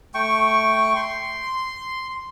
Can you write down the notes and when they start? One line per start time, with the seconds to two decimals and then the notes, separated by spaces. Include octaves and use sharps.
0.14 A3 G5 C#6
0.96 C6